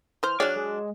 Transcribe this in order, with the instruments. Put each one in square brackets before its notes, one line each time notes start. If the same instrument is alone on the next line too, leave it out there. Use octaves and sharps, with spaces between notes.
[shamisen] E3 C5 [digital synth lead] F6
[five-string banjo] F#3 D4 [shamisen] G#4 C#5 D5
[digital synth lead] G#3